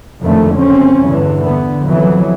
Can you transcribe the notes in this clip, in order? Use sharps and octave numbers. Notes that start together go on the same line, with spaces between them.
F#1 F2 D3 D#3 A3
F#1 C4 C#4
E2 G2 D3 E3
D3 B3
F2 E3 F#3